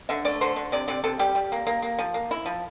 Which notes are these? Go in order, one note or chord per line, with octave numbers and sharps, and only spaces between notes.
D3 E5
A3 D5
D3 C5
D3
C3 D5
C3 D5
C3 A4
G3 G4
G3
A#3
A#3
A#3
F3
A#3
E4
F3